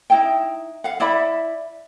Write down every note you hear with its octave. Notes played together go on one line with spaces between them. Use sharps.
D#4 E4 G5
F5 F#5
E4 D5 E5 B5